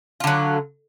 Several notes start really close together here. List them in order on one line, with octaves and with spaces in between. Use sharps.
F4 D3 F#3